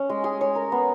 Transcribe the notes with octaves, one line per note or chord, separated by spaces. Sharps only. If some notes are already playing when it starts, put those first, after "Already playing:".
Already playing: C#4
G#3
G#4
C#5
A#4
B3